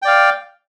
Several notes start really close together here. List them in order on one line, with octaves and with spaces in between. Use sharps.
G5 D5 F5